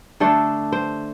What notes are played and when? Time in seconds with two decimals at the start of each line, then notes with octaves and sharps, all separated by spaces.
0.20 D3 A3 D4 A4
0.72 C5